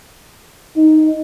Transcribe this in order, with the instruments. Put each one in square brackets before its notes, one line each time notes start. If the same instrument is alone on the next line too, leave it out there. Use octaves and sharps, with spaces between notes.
[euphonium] D#4